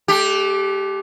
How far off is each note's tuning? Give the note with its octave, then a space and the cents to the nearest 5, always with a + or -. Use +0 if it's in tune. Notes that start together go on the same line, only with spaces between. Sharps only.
A3 -40 G4 +0